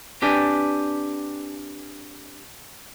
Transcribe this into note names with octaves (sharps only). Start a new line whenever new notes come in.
C4 D4 G4 B4 D5 G#5